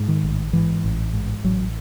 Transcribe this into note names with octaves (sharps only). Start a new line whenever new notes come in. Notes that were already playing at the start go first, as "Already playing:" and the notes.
Already playing: G#2
D#3
A1
G#2 E3
A1
G#2
A1 F#3